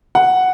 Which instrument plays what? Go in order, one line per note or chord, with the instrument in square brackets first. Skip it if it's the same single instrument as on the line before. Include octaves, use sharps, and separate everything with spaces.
[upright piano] F#5